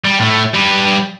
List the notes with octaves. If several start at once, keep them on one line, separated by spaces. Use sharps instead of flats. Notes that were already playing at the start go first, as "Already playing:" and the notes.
G3
A2 A3
G3 B4